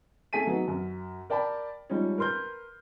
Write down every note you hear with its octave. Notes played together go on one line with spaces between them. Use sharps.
A3 G#4 G#5 B6 D#7
F#3 B3 D#4
F#2
A#4 D5 G5 A5 B5
F3 G3 G#3 C#4 D#4
A#4 B4 C6 F6 G6